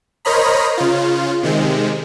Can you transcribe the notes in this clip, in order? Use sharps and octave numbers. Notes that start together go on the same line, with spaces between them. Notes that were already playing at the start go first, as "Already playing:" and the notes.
A#4 C5 C#5 D#5 A#5 B5
C#3 F4
C3 D#3 G#3